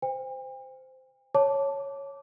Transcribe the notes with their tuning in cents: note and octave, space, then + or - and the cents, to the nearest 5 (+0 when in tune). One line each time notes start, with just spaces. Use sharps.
C5 -15 G5 +45
C#5 +0 A5 +0 D6 -15